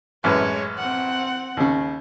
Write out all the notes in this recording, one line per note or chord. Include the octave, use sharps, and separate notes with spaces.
A1 F#2 G#3 B4 C#5
C4 F#5
D#2 C#3